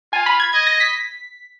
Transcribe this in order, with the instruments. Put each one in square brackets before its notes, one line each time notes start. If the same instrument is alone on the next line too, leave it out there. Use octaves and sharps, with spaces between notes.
[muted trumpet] F4 [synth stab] G#5
[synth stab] B5
G#6
[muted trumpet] D#5 [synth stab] G#6
[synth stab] A#6
B6